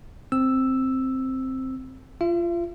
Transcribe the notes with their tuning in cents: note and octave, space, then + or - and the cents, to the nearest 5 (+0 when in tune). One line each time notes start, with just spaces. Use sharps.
C4 +0 E6 +0
F4 -20 E5 +45